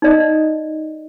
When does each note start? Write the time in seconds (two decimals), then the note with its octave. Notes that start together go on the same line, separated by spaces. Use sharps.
0.02 D#4 D5 D#5